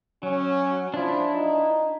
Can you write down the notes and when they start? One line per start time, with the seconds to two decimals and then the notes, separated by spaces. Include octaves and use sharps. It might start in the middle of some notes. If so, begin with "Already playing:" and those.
0.23 F#3 C#4
0.94 F3 D4 E4
1.34 D#4